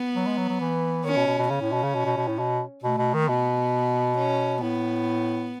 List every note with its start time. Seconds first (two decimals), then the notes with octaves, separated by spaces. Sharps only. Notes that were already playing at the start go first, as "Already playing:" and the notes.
Already playing: B3
0.16 F#3
0.27 G#3
0.38 F#3
0.49 F#3
0.60 E3
1.04 D#3 C#4
1.16 B2
1.27 B2
1.38 B2
1.50 C#3 C#4
1.61 A2
1.72 B2
1.83 C#3
1.94 B2
2.05 B2
2.17 B2
2.28 A2
2.38 B2
2.83 B2 A3
2.98 B2
3.14 D#3
3.28 B2 B3
4.18 C#4
4.62 A2 B3